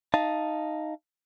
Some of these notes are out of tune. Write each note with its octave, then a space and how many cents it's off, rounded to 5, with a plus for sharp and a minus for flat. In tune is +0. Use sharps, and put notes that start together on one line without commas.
D#4 +0 F5 -15 A5 +0